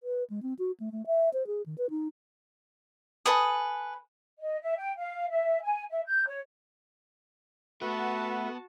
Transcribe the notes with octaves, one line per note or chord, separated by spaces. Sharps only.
B4
G#3
C4
F#4
A3
A3
E5
C5
G#4
D#3
B4
D#4
A4 B4 G#5 D#6
D#5
E5
G5
F5
E5
G#5
E5
G6
C#5
A3 B3 F#4 B4 E5 F#5 A5